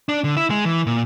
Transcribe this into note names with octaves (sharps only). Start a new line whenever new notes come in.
D4
D3
E4
G#3
E3
A#2